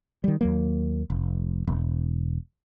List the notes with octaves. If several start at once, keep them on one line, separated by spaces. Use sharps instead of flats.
D#3 G3
D#2 F#3 A#3
F1
E1